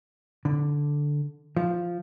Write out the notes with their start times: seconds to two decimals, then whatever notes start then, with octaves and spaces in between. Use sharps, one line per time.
0.45 D3
1.56 F3